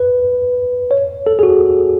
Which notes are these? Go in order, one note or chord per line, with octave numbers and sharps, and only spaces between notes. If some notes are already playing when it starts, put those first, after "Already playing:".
Already playing: B4
C#5
A4
G#4
F#4